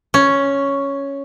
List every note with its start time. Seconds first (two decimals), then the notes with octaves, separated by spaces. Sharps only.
0.14 C#4